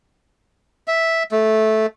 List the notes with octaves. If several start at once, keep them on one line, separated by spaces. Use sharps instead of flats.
E5
A3